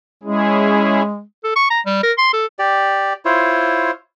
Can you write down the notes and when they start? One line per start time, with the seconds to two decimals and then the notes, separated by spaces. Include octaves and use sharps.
0.23 G#3 C#4 E4 G#4
1.44 A4
1.56 C#6
1.70 A#5
1.86 G3
2.03 A#4
2.18 C6
2.33 A4
2.59 G4 D5
3.25 E4 F4 C5 C#5